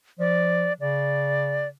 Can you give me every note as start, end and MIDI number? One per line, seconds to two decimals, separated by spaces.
0.19 0.71 53
0.19 0.73 74
0.81 1.72 49
0.81 1.68 74